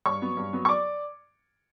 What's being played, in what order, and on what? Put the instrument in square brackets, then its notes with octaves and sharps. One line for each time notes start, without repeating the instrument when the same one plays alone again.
[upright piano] G2 C#5 C#6
F#3 B3
G2
F#3 B3
C#6
D5 D6